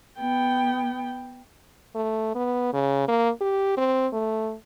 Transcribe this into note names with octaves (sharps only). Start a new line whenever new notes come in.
B3 G5
A3
B3
C#3
A#3
G4
C4
A3